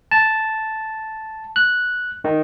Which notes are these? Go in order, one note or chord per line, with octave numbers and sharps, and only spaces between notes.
A5
F#6
D#3